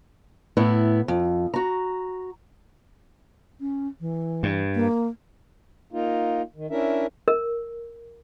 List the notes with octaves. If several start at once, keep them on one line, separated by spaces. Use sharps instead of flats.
A2 B3 E4
F2
F#4 A#5
C#4
E3
G2
A#3
A#3 D#4 F4
D#3
C#4 D4 E4 A#4 E5
A#4